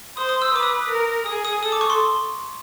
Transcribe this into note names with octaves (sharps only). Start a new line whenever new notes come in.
C5 D#6
D#6
E6
D#6
B4 D6
D#6
A#4
G#4 D#6
D#6
A4 D#6
D6
C#6
C6